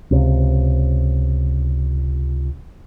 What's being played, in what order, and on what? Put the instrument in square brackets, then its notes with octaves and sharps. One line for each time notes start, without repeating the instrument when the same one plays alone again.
[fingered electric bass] C#2 C3